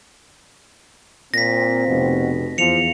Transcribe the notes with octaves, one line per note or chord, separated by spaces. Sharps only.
A#2 C4 A#6 B6
F1 B2
E2 F3 C#7 F7